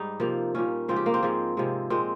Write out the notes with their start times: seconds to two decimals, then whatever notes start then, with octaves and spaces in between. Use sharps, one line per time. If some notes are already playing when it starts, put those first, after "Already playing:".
Already playing: G#2 G3 D#4
0.20 C3 F3 A#3
0.55 A#2 G3 A#3 C#4
0.88 C#3 F3 G#3 C4
0.96 G4
1.06 A#3
1.14 C4
1.23 G#2 F3 G#3
1.57 C3 F3 G#3
1.90 A#2 G#3 C4